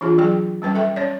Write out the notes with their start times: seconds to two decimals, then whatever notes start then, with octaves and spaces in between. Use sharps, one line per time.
0.01 E3 D4 F4 G#4
0.18 F#3 G#4 G5
0.62 G3 C#4 B4 G5
0.75 A4 E5 G5
0.96 C#4 C#5 D5